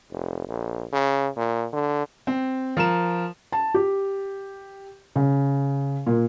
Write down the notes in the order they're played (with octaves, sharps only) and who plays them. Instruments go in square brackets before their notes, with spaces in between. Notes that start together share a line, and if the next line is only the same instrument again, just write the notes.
[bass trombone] F1
A#1
C#3
A#2
D3
[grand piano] C4
F3 A#4 E7
[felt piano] A5
G4
C#3
A#2